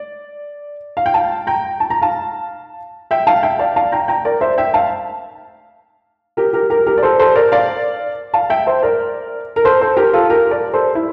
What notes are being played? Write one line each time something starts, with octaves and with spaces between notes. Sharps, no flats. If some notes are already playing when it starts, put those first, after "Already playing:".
Already playing: D5
F5
G5
F5 A5
G5 A#5
A5
A#5
F5 A5
E5 G5
F5 A5
E5 G5
D5 F5
F5 A5
G5 A#5
G5 A#5
A#4 D5
C5 E5
E5 G5
F5 A5
G4 A#4
G4 A#4
G4 A#4
G4 A#4
D5
A4 C5
A4 C5
A#4 D5
D5 F5
F5 A5
E5 G5
C5 E5
A#4 D5
A#4
A4 C5
A4 C5
G4 A#4
F4 A4
G4 A#4
A#4 D5
A4 C5
E4